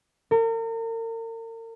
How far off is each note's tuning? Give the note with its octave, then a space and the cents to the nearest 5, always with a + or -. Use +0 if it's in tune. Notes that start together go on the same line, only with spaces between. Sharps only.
A#4 -40